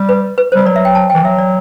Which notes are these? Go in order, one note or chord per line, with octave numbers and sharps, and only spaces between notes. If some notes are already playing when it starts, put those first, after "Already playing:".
Already playing: G3
B4
B4
C5
G3
F#3 D5
E5
G5
A5
G5
E3
F#3 E5
D5